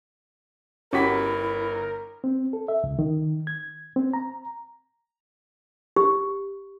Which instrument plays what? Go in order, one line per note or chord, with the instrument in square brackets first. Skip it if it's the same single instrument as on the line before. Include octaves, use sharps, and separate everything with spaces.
[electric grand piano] G1 B6 [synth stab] C#4 F#4 G4 [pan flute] E4 [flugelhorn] A#4
[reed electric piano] C4
A4
E5
C#2
D#3
G#6
C4
A#5
[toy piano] G4